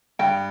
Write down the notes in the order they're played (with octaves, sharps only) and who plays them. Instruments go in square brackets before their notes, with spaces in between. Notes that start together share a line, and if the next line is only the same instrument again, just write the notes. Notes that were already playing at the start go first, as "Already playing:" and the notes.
[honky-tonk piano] G2 [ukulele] G5